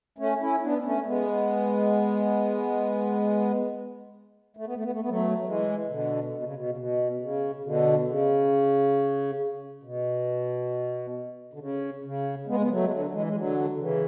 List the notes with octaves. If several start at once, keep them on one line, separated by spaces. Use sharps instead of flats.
A3 C#4
C#4 E4
B3 D4
D4
A3 C#4
A3
G#3 B3
A3
B3
A3
B3
A3
B3
F#3 A3
F#3
E3 G#3
B2 D3
B2
C#3
B2
C#3
B2
C#3
B2 D3
C#3
B2
D3
C#3
C#3
G#3 B3
B3
F#3 A3
G#3
D3 F#3
F#3
E3 G#3
G#3
D3 F#3
D3
C#3 E3